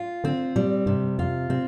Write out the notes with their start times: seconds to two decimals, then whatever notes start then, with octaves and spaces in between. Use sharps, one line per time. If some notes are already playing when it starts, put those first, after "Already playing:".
Already playing: F4
0.24 D3 C4
0.56 A#2 G3
0.86 G2 C3
1.19 F2 F4
1.50 C3 C4